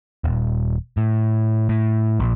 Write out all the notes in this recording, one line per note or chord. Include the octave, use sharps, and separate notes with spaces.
D#1
A2
A2
A#1